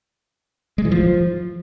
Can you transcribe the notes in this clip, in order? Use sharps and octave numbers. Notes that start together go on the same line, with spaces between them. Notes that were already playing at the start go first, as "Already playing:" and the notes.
G#3
E3
F3